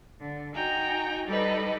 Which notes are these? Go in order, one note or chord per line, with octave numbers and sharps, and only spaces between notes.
D3
D#4 F#4 G5 G#5 A#5
G3 D#4 G4 A4 B4 D#5